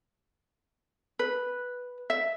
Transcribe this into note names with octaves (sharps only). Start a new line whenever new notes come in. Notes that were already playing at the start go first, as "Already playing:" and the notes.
B4
E5